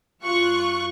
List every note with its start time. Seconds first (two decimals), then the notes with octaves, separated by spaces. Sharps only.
0.22 F#2 F4 C#6 F#6